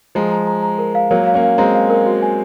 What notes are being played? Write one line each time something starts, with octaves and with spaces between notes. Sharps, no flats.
F3 G#3 A#5
A#5
A#5
A#5
A#4
F5
F#3 A#3 A#4
F5
A#3 C#4
F5
G#3 C4 A#5
F5
A#4
F#4
G#5